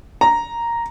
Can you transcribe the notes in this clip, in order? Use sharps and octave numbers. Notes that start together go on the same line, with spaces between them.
A#5